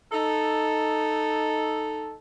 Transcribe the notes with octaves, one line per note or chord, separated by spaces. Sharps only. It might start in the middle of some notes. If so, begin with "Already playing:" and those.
D#4 A4